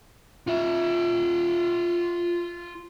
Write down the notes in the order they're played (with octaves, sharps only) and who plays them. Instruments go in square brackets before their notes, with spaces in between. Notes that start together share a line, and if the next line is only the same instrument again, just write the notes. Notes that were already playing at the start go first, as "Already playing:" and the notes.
[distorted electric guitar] F4 E5